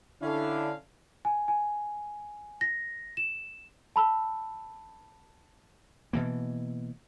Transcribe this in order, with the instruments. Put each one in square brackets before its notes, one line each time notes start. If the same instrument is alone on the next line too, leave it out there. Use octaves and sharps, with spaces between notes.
[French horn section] D3 D4 [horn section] C#4 F5 [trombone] E4
[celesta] G#5
G#5
A#6
E7
A5 B5 E6
[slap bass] B2 E3 A#3